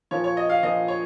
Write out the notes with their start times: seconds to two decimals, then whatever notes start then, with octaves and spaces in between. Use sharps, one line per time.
0.11 A#2 F3 C#5
0.24 C#5
0.37 D#5
0.50 F5
0.63 A#2 F3 D#5
0.88 C#5